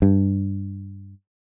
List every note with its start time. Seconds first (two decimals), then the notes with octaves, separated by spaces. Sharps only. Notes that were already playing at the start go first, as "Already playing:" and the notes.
0.02 G2